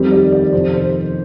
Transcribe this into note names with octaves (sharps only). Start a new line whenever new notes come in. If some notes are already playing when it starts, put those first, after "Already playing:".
Already playing: F2 D#3 G3 C4 G4
D5
D5
F2 C3 D#3 C5
C5